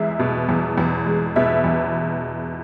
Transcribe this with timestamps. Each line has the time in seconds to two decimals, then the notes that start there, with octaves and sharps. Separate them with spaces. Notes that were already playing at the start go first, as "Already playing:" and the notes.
Already playing: E2 G#3 E5
0.19 B2
0.49 E2
0.78 E2
1.06 G#3
1.36 B2 E5
1.64 E2